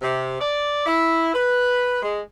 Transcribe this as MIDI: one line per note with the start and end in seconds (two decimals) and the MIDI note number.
0.02 0.38 48
0.40 0.83 74
0.86 1.33 64
1.34 2.00 71
2.03 2.19 56